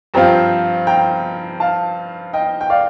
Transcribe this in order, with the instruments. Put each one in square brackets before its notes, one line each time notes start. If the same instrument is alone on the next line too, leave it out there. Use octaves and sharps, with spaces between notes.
[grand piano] G2 F3 C4 F4 [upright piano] G5 A#5
[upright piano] G5 A#5
F5 A5
D#5 G5
G5
D5 F5